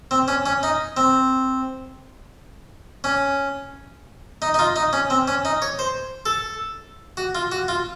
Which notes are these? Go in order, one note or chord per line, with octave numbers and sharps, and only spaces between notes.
C4
C#4
C#4
D#4
C4
C#4
D#4
D#4
F4
D#4
C#4
C4
C#4
D#4
C#5
C5
A4
F#4
F4
F#4
F4